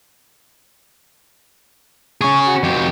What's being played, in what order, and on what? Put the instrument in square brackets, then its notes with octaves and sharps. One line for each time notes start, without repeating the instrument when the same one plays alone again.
[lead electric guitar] C#4 G#4 [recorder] C#6
[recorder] F#4
[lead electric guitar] F2 G4